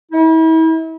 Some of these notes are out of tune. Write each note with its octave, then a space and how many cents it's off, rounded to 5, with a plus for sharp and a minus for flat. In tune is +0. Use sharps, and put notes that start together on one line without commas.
E4 -40